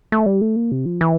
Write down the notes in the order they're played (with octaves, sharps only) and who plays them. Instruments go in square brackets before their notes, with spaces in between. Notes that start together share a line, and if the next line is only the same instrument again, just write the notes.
[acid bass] A3
G3
A3
A#3
C3
F3
E3